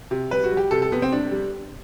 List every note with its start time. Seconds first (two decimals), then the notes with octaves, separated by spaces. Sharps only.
0.11 C3
0.31 G3 B4
0.44 F#4
0.52 G3
0.57 G4
0.71 C3 A4
0.82 A4
0.92 C3 B3
1.02 C4
1.12 G3 D4
1.32 G3